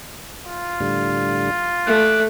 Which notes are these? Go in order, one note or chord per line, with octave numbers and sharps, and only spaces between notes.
F4
A2 D3 G3
A3 D6 F#6